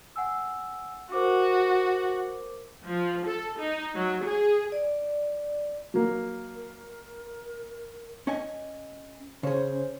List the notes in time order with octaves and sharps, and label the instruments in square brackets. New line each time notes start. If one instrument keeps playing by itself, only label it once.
[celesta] F#5 G#5 E6
[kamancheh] F#4 [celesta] A#4 C5 D6
[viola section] F3
A4
D#4
F#3
G#4
[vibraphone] D5
[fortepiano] F#3 A#3
[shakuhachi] A#4
[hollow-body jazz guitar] C#4 D#5 G#5
[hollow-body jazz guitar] C#3 G#4 [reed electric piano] C#4 C5 C#5